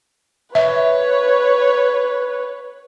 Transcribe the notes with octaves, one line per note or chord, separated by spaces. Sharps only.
B4 C#5 E5